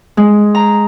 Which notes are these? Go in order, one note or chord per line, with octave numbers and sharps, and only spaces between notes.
G#3
A#5